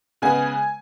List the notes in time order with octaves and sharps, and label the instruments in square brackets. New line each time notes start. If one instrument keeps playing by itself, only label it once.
[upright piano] C#3 G#3 B3 G#5